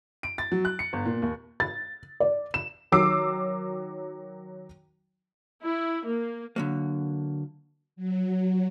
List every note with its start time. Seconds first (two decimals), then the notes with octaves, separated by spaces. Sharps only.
0.23 D7
0.38 A6
0.52 F#3
0.65 F#6
0.79 C#7
0.93 G1
1.05 A#2
1.22 D#2
1.60 A6
2.20 D5
2.54 E7
2.92 D#3 F#3 D6 E6 C7
5.63 E4
6.05 A#3
6.56 D3 F#3 A#3
7.96 F#3